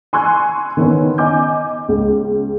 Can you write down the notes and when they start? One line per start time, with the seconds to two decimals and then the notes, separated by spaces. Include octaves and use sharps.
0.13 G#5 C6 C#6 E6 F#6 G#6
0.77 D#3 B3 C#4
1.18 D#5 G#5 D6 G6
1.89 C#2